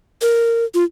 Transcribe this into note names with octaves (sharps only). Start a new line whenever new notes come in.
A#4
F4